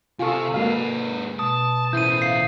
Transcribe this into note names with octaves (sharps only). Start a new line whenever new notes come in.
C3 F4 A4 G#5 C#6 D#6
G#2 G#3 A#3 F#4 B4 F5
B2 A5 D#6
E2 A2 C#4 E4 C5 G6 D#7
E5 F5 C7